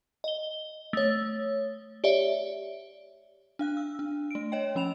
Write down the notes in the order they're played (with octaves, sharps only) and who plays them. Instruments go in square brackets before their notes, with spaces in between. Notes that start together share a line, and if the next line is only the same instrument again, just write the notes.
[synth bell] D#5 G7
A3 C#5
G4 C#5 D5 E5
D4 F5 F#6
E6
D4
A3 D7
C#5 D#5 G5
F3 C#4 B5 E7 F7